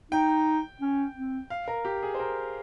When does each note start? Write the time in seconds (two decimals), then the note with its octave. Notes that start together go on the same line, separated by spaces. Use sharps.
0.12 D#4 G5
0.81 C#4
1.15 C4
1.50 F5
1.68 A#4
1.85 G4
2.03 G#4
2.14 C5
2.19 A#4